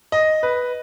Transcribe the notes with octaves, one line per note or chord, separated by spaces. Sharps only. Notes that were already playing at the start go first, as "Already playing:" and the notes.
D#5
B4